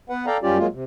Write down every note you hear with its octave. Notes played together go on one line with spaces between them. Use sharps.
B3 B4 F#5
A4 D5 F5 G5 A#5
F#2 G3 C#4 F4 G4 D5
F#3 G#3 A#3 F4
C3